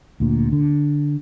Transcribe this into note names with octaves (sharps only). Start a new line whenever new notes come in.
D2 A#2
D3